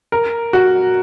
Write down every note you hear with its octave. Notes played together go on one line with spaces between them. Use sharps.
A#4
F#4